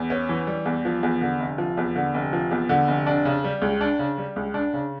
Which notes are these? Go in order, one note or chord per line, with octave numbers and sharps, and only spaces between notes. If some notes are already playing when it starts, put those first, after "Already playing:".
Already playing: E2
C#4
E3
G3
E2
F3
E2
D3
F1
F3
E2
D3
F1
F3
E2
D3
F1
D4
C#3
G3
C#2
D4
C#3
G3
C#2
D4
C#3